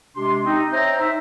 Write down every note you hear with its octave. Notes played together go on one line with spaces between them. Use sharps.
C3 G#3 D4 G4 C6
C4 D#4
C5 C#5 D#5 E5 G5 A#5
D#4 E5